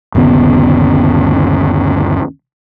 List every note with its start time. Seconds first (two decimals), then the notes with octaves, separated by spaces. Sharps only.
0.15 G1 D#2 C#3 B3